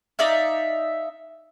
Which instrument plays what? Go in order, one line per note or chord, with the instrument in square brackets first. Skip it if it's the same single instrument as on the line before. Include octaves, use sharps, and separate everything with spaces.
[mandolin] D#4 D5 E5 F5